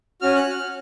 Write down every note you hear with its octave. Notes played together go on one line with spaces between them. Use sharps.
C#4 F#4 F6
F#6
F6